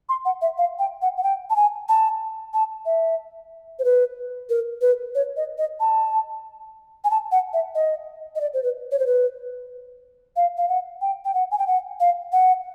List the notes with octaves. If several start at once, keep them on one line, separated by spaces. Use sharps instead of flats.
C6
F#5
E5
F5
G5
F#5
F#5
G5
A5
G#5
A5
A5
E5
C5
B4
A#4
B4
C#5
D#5
D#5
A5
G#5
A5
F#5
E5
D#5
D#5
D5
C5
B4
C#5
C5
B4
F5
F5
F#5
G5
G5
F#5
G#5
G5
F#5
F5
F#5